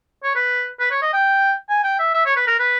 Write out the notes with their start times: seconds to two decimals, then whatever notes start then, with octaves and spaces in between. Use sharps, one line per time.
0.23 C#5
0.35 B4
0.80 B4
0.91 C#5
1.02 D#5
1.13 G5
1.69 G#5
1.84 G5
1.99 E5
2.14 E5
2.26 C#5
2.36 B4
2.47 A#4
2.59 B4